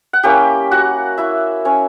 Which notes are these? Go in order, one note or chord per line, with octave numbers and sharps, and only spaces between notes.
F#5
A#3 C#4 E4 G4 G5
F#4 F#5
E4 E5
C#4 C#5